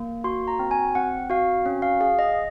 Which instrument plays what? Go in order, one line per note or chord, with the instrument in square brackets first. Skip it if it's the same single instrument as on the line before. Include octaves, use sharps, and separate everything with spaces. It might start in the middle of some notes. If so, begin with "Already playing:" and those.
Already playing: [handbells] A#3
F#4 C6
A#5
C4
G#5
C4 F#5
F#4 F5
C#4
F5
G#4 F5
D#5